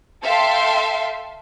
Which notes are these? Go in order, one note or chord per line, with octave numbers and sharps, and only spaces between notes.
A4 E5 F5 G5 C6